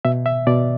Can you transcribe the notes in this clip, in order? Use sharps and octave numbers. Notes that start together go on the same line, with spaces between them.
B2 E5
E5
B2 D5